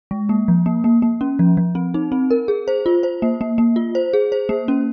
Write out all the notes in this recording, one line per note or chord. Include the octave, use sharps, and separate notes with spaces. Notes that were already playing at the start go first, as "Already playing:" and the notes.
G#3
A#3
F3
A#3
A#3
A#3
C#4
F3
F3
C4
D#4
C4
A#4
G#4
C5
F4
C5
A#3
A#3
A#3
F4
C5
G#4
C5
A#3
C#4